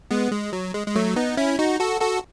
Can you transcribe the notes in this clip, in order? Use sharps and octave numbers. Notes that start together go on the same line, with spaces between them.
G#3 B3
G#3
F#3
G#3
G#3
F#3 A3
B3 D#4
C#4 E4
D#4 F#4
F#4 A4
F#4 A4